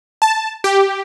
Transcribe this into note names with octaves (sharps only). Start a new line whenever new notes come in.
A5
G4